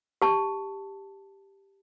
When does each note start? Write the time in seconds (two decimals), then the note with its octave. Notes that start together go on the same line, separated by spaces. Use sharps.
0.22 G4 A5